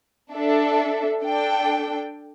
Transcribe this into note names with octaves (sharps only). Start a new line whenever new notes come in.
D4 A4 E5
D4 A4 G5